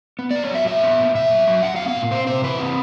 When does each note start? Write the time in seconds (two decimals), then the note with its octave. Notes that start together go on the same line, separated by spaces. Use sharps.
0.19 B3
0.31 D5
0.36 B3
0.43 C#5
0.51 F#3 E5
0.67 A#2 E5
0.83 B3
0.99 A#2
1.15 A#2 E5
1.31 F#3
1.47 F#3
1.63 F#3 F#5
1.76 F5
1.79 B3
1.88 F5
1.95 A#2
2.11 C4 C5
2.27 C3 C5
2.43 E3 B4
2.59 C4